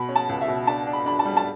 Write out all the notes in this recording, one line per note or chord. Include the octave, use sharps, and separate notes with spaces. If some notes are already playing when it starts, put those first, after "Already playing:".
Already playing: B2 B5
C#4
A5
C#2
E5
B2
D4 A5
D4
B5
D4 B5
A5
G3
A5